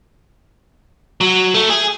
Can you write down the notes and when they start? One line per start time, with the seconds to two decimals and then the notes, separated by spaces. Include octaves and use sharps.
1.21 F#3
1.54 A3
1.70 G#4